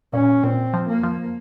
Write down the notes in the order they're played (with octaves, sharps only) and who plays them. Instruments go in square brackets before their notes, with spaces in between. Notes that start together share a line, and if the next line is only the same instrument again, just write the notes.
[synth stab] A#2 [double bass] C#4
[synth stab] A#2 [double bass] C4
[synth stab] F3
[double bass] A#3
[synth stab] F3